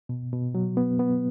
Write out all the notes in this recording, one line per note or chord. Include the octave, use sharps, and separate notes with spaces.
B2
B2
F#3
B3
B3